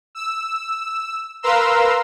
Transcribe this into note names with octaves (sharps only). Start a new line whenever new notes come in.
E6
A#4 B4 F5 A#5 C6 E6